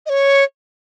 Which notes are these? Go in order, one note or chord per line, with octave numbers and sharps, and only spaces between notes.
D#5
C#5